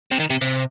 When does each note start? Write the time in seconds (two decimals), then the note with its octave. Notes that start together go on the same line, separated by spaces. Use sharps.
0.12 C3
0.20 D#3
0.30 C3
0.41 C3